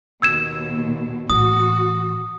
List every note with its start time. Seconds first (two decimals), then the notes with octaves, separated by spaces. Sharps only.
0.22 D#2 B2 E6 G#6 E7
1.30 A2 E3 F#4 D#6